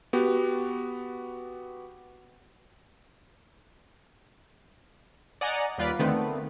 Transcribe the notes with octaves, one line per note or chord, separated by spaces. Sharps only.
B3 F#4 G4
D5 D#5 F#5 G#5 A#5
D#2 G3 F4 B4 D5 B6
D3 D#3 A3 B3 C4